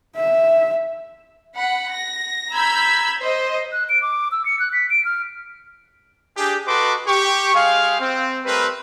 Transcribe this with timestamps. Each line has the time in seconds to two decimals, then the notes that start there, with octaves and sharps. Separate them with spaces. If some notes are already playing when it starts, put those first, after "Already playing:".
0.16 E5
1.56 F#5 B5
1.93 A#6
2.53 A#5 B5 E6 G6 G#6 B6
3.20 C5 D#5
3.72 F#6
3.89 D7
4.02 D6
4.31 E6
4.45 C#7
4.59 F#6
4.73 B6
4.90 D7
5.05 F6
6.37 D4 G4 G#4
6.67 F#4 A4 B4 D#5 C6 D6
7.08 G4 C#6
7.55 G#3 G4 G#4 F5
8.01 C4
8.45 G3 A3 C4 A#4 B4